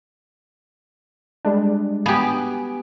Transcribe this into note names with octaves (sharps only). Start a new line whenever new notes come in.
G3 G#3 D4
B3 G4 G#5